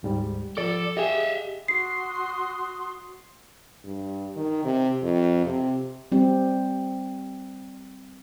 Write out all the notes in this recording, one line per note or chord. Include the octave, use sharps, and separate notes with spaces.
D2 G#2 G3
F3 A4 D5 D6
G4 G#4 D#5 E5
F#4 C6 D#6 C7
G2
D#3
C3
F2
C3
G3 C4 G4